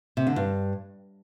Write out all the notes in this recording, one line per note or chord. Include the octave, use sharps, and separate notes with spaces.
C3
D3
G2